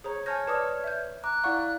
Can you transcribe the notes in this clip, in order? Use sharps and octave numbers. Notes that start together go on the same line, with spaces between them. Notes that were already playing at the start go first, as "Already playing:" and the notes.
G#4 C5 C#5 A#5
C#5 G#5 A5 F6 G6 G#6 A#6
B4 D5 A5 D6 D#6 F6
E5 G6
A#5 D6 F#6
E4 D5 F5 F#5 C#6